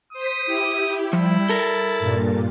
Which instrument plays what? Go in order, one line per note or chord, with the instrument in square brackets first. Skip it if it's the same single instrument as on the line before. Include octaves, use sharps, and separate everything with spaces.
[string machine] C5 B6 [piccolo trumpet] D#6
[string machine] E4 G4
[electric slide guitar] F3 [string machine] G3 [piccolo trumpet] E4
[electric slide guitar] A4 A#4 [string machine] A6
[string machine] G2 A#2